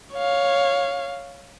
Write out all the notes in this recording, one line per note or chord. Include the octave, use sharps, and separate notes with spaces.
C#5 F5